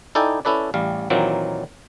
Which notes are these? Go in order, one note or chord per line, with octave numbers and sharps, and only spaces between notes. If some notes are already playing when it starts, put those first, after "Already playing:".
D#4 E4 A4 D5 G5 G#5
C#4 E4 A4 B4 D5
A1 G3 F5
A#2 D#3 E3 F#3 A#3 C4